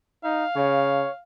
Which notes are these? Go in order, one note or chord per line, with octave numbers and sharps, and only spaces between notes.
D#4 F5
C#3 C#5